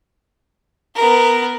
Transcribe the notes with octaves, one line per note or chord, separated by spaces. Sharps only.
B3 A#4